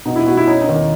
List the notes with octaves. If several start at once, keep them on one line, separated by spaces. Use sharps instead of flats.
B2 D#4
E4
B2 F#4
E4
C#4 D#4
D#4
D#2